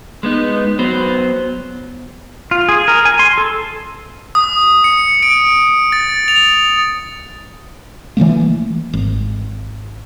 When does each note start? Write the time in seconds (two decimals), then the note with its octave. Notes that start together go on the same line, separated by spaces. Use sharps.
0.23 G#3 B3 D#4
0.79 F#3 B3 C5
2.51 F4
2.69 G#4
2.88 A#4
3.05 G#5
3.19 C6
3.38 A4
4.35 D#6
4.84 C#7
5.23 D7
5.92 A6
6.28 F7
8.17 E3 F3 A3 A#3
8.93 G#1